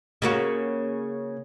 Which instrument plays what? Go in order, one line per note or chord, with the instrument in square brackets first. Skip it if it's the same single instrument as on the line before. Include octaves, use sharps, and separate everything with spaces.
[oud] C#3 A#3 F#4